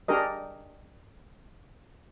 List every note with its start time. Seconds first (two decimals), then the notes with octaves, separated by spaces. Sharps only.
0.08 D4 G4 G#4 A#4 D#5